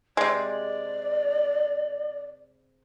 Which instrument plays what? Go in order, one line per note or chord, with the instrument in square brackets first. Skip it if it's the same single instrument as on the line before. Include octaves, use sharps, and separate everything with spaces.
[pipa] C3 G#3 [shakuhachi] D5